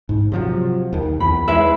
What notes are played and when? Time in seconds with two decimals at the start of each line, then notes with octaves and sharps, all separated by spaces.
0.09 G#2
0.32 C3 F3 F#3
0.93 D#2 D#3
1.20 E2 B5
1.48 E2 G#3 E4 B4 E5